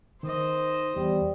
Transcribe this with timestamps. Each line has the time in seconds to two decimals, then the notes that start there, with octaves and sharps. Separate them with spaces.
0.23 D#3 C5 D#5
0.96 E2 G3